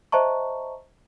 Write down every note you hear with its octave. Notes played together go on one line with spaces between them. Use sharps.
C5 D#5 E5 A5 A#5 C#6